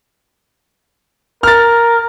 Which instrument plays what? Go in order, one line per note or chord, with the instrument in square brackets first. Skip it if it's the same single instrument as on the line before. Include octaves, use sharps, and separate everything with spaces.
[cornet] A#4 [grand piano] F6 A6